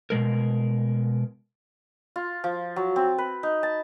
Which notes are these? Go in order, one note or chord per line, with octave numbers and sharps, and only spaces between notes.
B2 D#3 G#3 A#4
F4
F3
F#3
C4
B4
D#4
A5